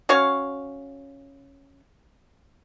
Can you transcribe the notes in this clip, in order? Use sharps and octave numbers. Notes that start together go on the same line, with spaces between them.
C#4 F#4 C#5 F5